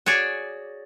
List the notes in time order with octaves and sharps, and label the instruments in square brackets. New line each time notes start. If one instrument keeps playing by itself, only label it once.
[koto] F#4 G#4 C#5 D5